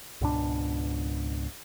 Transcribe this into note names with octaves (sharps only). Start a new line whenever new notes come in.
C#2 G#2 B2 D4